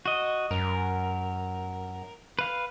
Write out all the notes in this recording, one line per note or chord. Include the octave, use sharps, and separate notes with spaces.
F#4 D#5
F#2 A#4
B4 F5